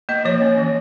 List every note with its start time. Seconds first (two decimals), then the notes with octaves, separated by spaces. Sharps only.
0.09 A#3 D#5
0.25 F3 C#5
0.42 C#4
0.57 E3